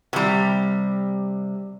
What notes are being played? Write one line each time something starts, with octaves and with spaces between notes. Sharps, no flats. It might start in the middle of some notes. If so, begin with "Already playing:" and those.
C3 G3